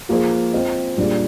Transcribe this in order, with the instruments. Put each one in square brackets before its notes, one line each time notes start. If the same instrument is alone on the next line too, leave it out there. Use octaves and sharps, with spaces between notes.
[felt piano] F3 A#3 F4 G#4 C5
C4 F4 C5 D#5
A#2 G3 D4 G#4 D5